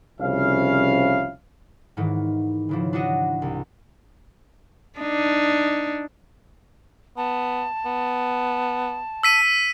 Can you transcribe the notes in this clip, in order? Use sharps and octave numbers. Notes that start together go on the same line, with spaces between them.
C2 C#3 F3 C#4 E4 F5
G#2 D#3 E3
C#3 E3 F3
D4 E4 F#4 D#5
C2
D4 D#4
B3 A5
B3
E6 B6 D#7